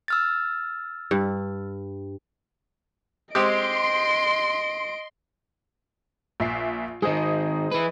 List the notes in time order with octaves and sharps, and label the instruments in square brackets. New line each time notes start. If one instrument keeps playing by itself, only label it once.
[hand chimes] E6 F6 A6
[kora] G2
[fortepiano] G#3 C4 G4 [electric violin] D#5 D7 [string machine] C6
[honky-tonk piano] A#1 E5 C7
[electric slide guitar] D#3 G#3 [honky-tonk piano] G#4 C5 D#5
[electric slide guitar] E3 B4